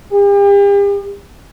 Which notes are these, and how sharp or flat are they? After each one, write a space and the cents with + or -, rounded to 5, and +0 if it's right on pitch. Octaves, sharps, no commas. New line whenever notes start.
G4 +40